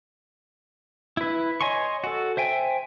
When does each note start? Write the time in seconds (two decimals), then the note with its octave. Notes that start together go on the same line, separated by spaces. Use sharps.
1.17 E4 B4
1.61 C#5 D#5 G#5 C6 C#6
2.04 F#4 A4
2.37 C5 E5 G5 G#5